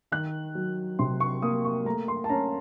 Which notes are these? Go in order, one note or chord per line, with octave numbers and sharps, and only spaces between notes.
D#3 F#6
F#3
C3 C6
C#6
A#3 D#6
C#6
A3 A#5
C6
A5
C#4 A#5